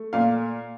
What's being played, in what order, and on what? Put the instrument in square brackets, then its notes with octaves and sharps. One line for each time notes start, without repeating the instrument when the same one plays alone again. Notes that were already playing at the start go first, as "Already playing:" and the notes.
Already playing: [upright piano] A3
A#2 F5